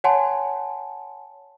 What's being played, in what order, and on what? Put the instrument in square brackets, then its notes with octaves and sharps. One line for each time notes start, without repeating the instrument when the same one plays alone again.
[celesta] C#5 F#5 G#5 A5 C6